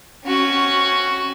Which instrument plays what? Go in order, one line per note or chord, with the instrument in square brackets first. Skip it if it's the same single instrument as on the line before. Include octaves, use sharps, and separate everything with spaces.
[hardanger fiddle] C#4 F#4